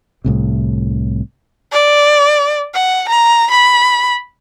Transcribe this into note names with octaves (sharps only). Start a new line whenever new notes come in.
C2 A2 C3
D5
F#5
A#5
B5